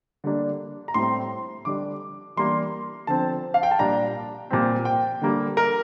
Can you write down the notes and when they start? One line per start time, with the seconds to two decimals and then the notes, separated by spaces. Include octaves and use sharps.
0.24 D3 G3 A#3 D4
0.88 A#5
0.94 A2 G3 C4 C6
1.65 D3 G3 D4 D6
2.36 E3 G3 A#3 D4 C6
3.07 D3 F3 C4 A5
3.54 F5
3.63 G5
3.71 A5
3.79 A#2 G3 D4 A#5
4.50 A#2 G3 C4
4.85 G5
5.21 D3 G3 A#3
5.57 A#4